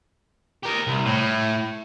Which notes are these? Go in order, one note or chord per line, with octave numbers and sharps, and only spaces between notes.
G4 A#4
C2
A2